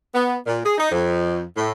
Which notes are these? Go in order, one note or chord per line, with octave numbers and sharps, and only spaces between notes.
B3
A#2
G#4
D#4
F2
A2